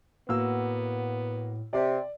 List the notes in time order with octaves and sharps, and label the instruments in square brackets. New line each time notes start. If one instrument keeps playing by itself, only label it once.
[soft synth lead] A2 [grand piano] A#3 F#4 E6 [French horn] B3
[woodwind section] C3 [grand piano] D5